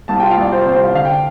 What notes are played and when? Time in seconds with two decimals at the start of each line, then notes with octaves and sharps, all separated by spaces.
0.08 C2 A5
0.20 G5
0.23 F4
0.30 F5
0.38 C2 D5
0.52 F4 C5
0.62 C5
0.66 C3
0.73 C5
0.81 C2 F5
0.94 D3 F5
1.05 D4 G5